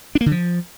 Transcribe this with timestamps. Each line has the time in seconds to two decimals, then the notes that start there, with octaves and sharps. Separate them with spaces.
0.15 D4
0.21 A#3
0.26 D3
0.31 F3